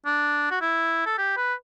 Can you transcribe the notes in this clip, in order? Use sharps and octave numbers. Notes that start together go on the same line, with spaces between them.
D4
F#4
E4
A4
G4
B4